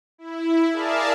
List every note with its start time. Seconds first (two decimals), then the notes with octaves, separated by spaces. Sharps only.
0.18 E4
0.72 G#4 A#4 D5 E5 F5 A5